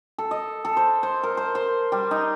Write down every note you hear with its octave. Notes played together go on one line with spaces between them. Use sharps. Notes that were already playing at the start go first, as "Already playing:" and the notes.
A4
D#5
A4
C5
C5
A#4
C5
C5
G3
D#4